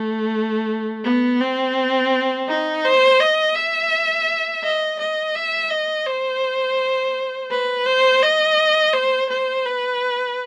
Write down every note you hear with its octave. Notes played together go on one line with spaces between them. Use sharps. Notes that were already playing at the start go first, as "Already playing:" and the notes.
Already playing: A3
B3
C4
D#4
C5
D#5
E5
D#5
D#5
E5
D#5
C5
B4
C5
D#5
C5
C5
B4